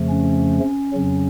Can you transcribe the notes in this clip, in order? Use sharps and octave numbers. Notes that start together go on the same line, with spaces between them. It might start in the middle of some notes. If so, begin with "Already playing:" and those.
Already playing: F2 C#3 F3 A3
C#4
F2 C#3 F#3